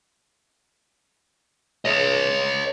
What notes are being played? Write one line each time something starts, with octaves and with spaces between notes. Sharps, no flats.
C#5 D#5